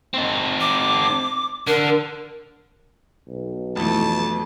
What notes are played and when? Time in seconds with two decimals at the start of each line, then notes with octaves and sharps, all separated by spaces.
0.14 C4 D#4
0.60 D6
1.67 D3 A#4
3.28 B1
3.76 F2 E3 A3 A5